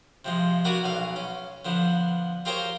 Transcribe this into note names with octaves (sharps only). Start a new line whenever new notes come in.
C3 F3 G#3
B3 D4 F#4 A#4 D5 G#5
B1 B2 F5
C#4
D3 F3 B3
F4 G4 G#4 A#4 C5 C#5